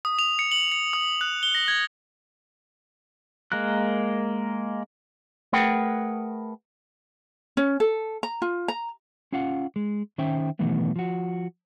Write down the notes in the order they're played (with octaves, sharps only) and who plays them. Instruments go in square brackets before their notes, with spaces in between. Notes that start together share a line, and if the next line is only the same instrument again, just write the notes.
[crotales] D#6
F7
C#7
F#7
C#7
D#6
F#6
G7
A#6
G#6
[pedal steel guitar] G#3 A#3 A#4 F#6
[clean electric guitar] A3 G#4 A#4 B4 F#5 G5
[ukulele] C#4
A4
A#5
F4
A#5
[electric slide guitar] C#4 F4 F5 F#5
G#3
D#3 C#4 C5 E5 G5
B2 D#3 E3 F#3 A3 B3
F3 F#4